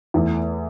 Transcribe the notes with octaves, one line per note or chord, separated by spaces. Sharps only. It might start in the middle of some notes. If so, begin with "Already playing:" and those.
E2 E3 A3